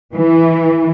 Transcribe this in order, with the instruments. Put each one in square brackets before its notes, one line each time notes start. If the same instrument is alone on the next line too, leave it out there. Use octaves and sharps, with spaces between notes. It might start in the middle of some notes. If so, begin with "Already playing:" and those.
[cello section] E3